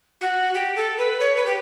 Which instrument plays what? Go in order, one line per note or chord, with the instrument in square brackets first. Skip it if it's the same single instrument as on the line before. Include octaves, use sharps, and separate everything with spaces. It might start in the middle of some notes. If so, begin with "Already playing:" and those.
[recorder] F#4
G4
A4
B4
C#5
B4
G4